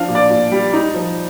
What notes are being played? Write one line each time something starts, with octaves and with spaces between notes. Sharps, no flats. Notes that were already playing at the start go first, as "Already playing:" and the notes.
Already playing: F3 D4 F5
A#2
D5
A#2
G3
D#4
F3